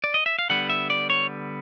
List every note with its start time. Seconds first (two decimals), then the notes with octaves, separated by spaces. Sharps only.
0.04 D5
0.14 D#5
0.26 E5
0.39 F5
0.50 D3 G3 B3 F#5
0.70 E5
0.90 D5
1.10 C#5